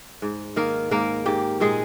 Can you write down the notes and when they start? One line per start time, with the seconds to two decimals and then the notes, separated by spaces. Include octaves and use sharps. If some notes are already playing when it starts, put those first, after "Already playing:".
0.22 G#2
0.56 D#3 A#3 A#4
0.91 G#2 A#3 A#4
1.26 G#2 G4
1.60 A#2 G#3 G#4